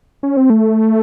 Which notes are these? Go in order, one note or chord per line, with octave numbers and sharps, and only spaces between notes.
C#4
C4
A3